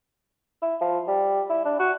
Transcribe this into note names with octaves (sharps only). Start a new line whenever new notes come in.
E4
F3
G3
E4
D4
F#4